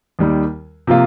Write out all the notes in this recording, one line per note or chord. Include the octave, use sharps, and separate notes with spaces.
D#2 D#3 G3
C3 F3 A#3 F4